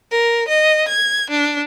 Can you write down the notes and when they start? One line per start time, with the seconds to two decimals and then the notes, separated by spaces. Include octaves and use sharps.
0.10 A#4
0.47 D#5
0.88 G#6
1.30 D4